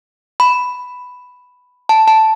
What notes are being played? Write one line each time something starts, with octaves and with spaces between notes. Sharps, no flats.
B5
A5
A5